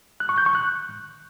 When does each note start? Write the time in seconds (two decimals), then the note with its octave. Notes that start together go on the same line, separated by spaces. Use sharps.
0.20 F#6
0.29 C#6
0.38 G6
0.46 C#6
0.55 F#6